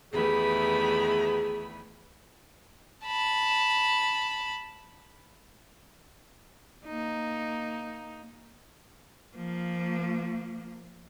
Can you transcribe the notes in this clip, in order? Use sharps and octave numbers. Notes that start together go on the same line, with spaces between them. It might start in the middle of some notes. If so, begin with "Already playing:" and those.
E2 D#3 A3 G4 G#4 B4 B5
A5 B5
A#3 D#4
F3 A#3